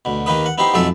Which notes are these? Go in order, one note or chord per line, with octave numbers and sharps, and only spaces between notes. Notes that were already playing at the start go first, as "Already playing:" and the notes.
D2 B2
D#2 D#3 A#3 D#4 B4 D#6
F#5
B3 D#4 E4 G4 C5
B1 F2 F#3 G#3 A4 E5